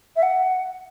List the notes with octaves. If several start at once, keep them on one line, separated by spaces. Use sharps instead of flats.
E5
F#5